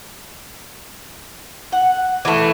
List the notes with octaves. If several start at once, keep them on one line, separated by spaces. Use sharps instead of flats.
F#5
E3 A3